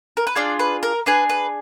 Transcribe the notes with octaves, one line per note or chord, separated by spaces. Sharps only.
A#4
B4
D4 F4 G#4 D5
B4
A#4
D4 G#4 B4
B4